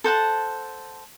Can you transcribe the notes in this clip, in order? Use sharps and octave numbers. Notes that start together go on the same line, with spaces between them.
A4 C5 F#5 A5